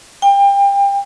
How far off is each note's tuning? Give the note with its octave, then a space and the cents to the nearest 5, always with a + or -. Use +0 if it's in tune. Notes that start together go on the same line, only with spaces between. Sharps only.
G5 +30